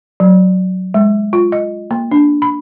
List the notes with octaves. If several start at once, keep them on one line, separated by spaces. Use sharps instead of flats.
F#3
G#3
F4
D#5
A#3
D4
B5